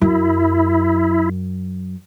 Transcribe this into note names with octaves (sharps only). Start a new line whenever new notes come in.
F#2 E4